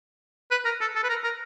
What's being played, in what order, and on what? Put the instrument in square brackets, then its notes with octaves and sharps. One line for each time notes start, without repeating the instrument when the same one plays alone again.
[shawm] B4
A#4
A4
A4
B4
A#4
A#4